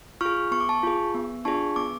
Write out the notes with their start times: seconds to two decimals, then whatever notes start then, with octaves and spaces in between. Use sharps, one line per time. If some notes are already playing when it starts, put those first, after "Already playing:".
0.21 F4 G#4 C#6 F6
0.51 B3 C#6
0.60 D6
0.69 A5 C#6
0.83 F4 G#4
1.15 B3
1.45 D4 F4 G#4 A5 C#6
1.76 B3 D6